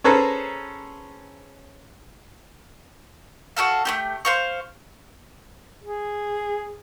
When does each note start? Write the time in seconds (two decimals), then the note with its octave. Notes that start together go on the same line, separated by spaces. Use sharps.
0.04 C#4 G#4 A4 B4 C5 A#5
3.57 F#4 G4 A4 F5
3.85 A3 B3 G4
4.25 C5 F5 C#6
5.84 G#4